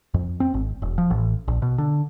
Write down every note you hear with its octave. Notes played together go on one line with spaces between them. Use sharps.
F2
C4
G#1
E1
F3
A1
A#1
B2
D3